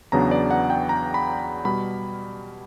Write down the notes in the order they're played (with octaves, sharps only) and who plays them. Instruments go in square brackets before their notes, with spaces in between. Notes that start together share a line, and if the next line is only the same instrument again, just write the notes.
[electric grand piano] E2 C#3 F#3 B3 D4 A#5
D5
F#5
G5
A#5
B5
B2 G3 B5